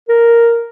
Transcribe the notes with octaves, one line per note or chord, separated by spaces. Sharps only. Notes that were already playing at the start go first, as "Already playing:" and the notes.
A#4